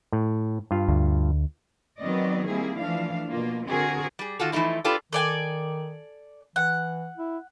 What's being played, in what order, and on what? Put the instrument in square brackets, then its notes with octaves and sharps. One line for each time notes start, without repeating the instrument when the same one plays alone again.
[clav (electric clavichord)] A2
G2 F4
[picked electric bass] D2
[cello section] D#3 F#3 B3 C4 D5 D#5
G3 A#3 C4 E4 G#4
E3 F3 A3 D4 F5
B2 A#3 F4
D3 C4 F#4 G#4 A#4
[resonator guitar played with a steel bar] G3 G#4
D#3 F4 F#4 A4
E3 F3 A3 D#4 E4
D4 F4 G4 A4 B4
[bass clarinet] D#3 [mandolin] A4 D5 G#5
[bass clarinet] E3 [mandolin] F#5
[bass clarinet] E4